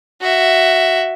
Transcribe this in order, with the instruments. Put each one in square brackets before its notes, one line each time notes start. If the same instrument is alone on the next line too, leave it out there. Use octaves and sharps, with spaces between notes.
[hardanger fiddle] F#4 E5